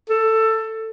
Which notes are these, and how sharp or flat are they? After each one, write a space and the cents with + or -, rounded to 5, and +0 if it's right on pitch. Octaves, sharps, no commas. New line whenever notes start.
A4 +15